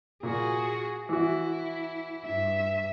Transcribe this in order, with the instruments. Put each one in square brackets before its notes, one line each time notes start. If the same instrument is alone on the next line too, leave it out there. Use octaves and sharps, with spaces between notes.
[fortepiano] A#2 [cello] F#4 G#4
[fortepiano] E3 F#4 [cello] E4
[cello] G2 E5